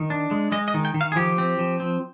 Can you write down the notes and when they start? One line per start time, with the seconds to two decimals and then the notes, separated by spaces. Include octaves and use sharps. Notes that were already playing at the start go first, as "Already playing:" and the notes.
Already playing: D#3
0.10 D4
0.31 G#3
0.52 G#3 D#5
0.68 D#5
0.74 D#3
0.85 G5
0.94 D#3
1.01 F5
1.12 G#4
1.16 F3 G4
1.38 C4
1.59 F3
1.80 C4